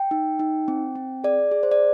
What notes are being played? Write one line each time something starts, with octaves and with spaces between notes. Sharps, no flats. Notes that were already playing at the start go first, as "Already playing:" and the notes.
Already playing: G5
D#4
D#4
C4
C4
G#4 D5
G#4
C5
D5